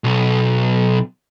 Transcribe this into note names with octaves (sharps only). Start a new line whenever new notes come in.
B1